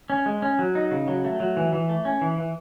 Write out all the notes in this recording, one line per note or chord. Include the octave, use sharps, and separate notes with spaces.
C#4
G#3
C#4
F#3
D#4
C#3
F#3
A3
F#3
E3
E3
A3
C#4
E3
E3